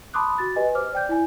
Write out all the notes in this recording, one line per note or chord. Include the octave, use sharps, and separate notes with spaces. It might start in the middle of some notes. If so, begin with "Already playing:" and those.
A5 B5 C6 D6 D#6 F#6
F#4 A6
G4 B4 D#5 G#5
C5 D6 F6
D5 G5 G6
E4 G#5